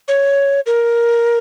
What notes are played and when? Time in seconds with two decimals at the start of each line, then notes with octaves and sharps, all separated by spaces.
0.08 C#5
0.66 A#4